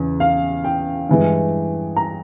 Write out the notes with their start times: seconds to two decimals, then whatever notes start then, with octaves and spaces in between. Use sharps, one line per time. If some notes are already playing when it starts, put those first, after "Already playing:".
Already playing: E2 C#3
0.20 F5
0.64 G5
1.09 G2 E3 G#3
1.96 A#5